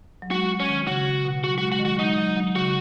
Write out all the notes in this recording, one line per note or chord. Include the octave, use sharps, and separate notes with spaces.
F#3
G#3 F#4
C#4
D#3
C#3 F#4
B2
F#3 F#4
G#3 F#4
G#3 F#4
D#3
F#3 F#4
G#3 D#4
F#3
F#3
C#3 F#4